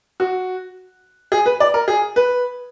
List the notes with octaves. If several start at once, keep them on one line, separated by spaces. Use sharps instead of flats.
F#4
G#4
B4
D5
A#4
G#4
B4